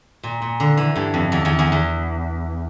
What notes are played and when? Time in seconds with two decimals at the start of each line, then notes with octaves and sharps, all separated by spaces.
0.24 A#2
0.42 A#2
0.60 D3
0.77 E3
0.96 G2
1.14 F2
1.32 E2
1.45 E2
1.59 E2
1.72 E2